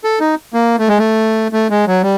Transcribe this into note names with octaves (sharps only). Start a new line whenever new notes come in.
A4
D#4
A#3
A3
G#3
A3
A3
G#3
F#3
G3